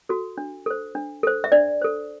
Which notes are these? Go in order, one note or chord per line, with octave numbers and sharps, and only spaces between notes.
F#4 A4
D4
A4 C5
D4
A4 C5
E5
D4 D5
A4 C5